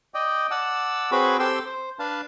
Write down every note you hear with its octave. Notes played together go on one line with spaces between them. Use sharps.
D5 D#5 G5
D5 F#5 A5 E6
C4 F#4 G#4 B4 C#5 B5
C4 G4 A4 G5 C6 E6
C5
D4 B4 F5 A5